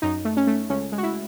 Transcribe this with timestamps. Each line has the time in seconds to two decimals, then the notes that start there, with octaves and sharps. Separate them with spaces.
0.02 F#2 D#4
0.25 A3
0.37 C#4
0.47 A3
0.69 C#2 C#4
0.92 G#3
0.98 F#4
1.03 E4